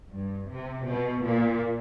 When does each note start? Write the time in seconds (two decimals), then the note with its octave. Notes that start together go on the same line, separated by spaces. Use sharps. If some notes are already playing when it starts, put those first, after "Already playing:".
0.13 G2
0.51 C3
0.88 B2
1.25 A#2